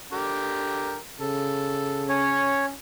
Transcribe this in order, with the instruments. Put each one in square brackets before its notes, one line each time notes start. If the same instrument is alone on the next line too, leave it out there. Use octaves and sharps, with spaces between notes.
[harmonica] D3 G4 A#4
[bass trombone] C#3 [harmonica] A4
[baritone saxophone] C#4 [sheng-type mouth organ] C#5